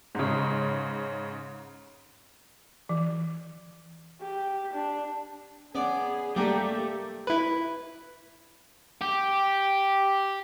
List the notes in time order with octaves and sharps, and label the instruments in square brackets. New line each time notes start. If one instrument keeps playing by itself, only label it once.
[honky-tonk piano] G#2 C#3
[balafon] E3
[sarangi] G4
D4
[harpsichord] B3 D5 [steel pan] C#4 [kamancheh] G#4
[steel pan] G3 G5 [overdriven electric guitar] A3 [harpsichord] A#3 D4 [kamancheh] G4
[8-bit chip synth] E4 B4
[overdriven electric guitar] G4